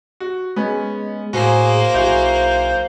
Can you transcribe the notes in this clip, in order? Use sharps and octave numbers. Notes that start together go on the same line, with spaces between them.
F#4
G#3 B3 C#4
A2 A#3 F#4 G#4 C5
B1 E4 F#4 G#4 G6